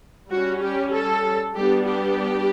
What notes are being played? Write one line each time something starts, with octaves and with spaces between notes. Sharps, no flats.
G3 C#4 F#4
G4
A4
G3 B3 D4 G4
G4